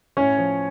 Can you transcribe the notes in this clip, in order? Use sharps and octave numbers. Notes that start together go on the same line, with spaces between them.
A2 C#4 C#5
F3